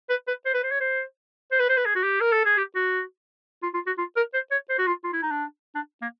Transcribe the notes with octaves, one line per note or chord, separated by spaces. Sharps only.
B4
B4
C5
B4
C5
C#5
C5
C5
B4
C5
B4
G#4
F#4
G4
A#4
A4
G#4
G4
F#4
F4
F4
F#4
F4
A#4
C5
C#5
C5
F#4
F4
F4
E4
D#4
D4
D4
A#3